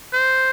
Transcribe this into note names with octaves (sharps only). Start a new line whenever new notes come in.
C5